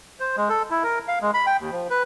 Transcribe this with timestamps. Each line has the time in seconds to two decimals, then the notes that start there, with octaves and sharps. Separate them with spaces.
0.20 C5
0.37 G#3
0.49 A4
0.71 E4
0.84 A#4
1.08 F5
1.22 G#3
1.34 B5
1.47 G5
1.59 D#2
1.72 F3
1.90 B4